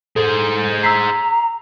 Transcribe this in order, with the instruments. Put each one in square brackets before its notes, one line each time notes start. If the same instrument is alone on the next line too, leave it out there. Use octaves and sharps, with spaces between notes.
[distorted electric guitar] G#4 C5 [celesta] A4
[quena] A#5 [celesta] E6 B6 C7